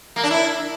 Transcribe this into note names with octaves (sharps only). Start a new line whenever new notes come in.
A#3
D4
E4